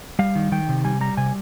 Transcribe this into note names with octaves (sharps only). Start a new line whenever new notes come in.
G3 F5
D#3
D#3 G5
C3
G3 G#5
G3 A#5
C3 G#5